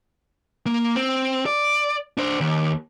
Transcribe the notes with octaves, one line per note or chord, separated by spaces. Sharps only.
A#3
C4
D5
D4 C5
D#2